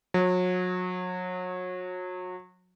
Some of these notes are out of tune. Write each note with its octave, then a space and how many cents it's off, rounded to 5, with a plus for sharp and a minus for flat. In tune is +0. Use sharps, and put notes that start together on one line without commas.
F#3 -30